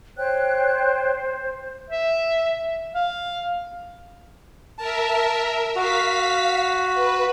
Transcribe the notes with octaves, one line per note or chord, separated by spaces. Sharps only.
C5 C#5 G5 F#6
E5
F5
A#4 E5 A5
F#4 F5 B6
B4